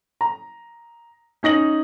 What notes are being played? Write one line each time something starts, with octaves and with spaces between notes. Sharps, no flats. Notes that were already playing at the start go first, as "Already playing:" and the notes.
A#5
C#4 D#4 A#6 F#7